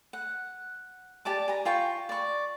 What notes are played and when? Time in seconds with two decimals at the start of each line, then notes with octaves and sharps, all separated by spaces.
0.13 F#5
1.25 G4 D5 A5 D6
1.48 G#5 A#5
1.65 F4 G5 C#6
2.09 D5 C#6